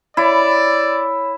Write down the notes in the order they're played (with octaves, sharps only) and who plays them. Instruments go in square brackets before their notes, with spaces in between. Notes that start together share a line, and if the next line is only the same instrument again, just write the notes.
[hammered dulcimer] E4 [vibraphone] C#5 B5 [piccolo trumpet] D5